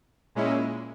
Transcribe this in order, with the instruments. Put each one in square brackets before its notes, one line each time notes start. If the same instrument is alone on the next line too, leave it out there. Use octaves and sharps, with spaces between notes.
[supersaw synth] A#2 G#3 C#4 E4